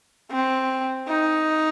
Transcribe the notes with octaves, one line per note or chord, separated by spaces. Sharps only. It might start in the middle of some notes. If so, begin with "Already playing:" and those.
C4
D#4